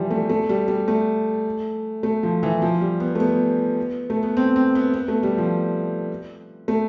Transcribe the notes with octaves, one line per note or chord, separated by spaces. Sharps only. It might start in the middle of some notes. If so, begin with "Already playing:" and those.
Already playing: E3 F3 G3
A3
A3
G3
G3
A3
A3
F3
E3
F3
G3
B3
A3
B3
A3
B3
C4
C4
B3
B3
A3
G3
F3
A3